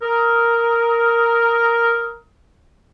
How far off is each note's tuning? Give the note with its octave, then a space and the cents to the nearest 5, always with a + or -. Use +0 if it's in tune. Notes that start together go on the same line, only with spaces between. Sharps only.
A#4 +0 D#6 +25